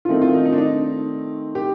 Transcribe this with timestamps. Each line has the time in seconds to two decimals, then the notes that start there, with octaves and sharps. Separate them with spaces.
0.05 F4
0.09 D#3 A3 C4 D#4
0.22 F4
0.33 D#4
0.46 D#4
0.53 D4
0.58 D#4
1.55 G4